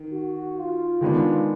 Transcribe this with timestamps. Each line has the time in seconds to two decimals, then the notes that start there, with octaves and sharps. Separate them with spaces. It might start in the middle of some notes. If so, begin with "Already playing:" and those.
Already playing: D#3
0.12 F#4
0.57 F4
1.01 D#3 G#3 B3 D4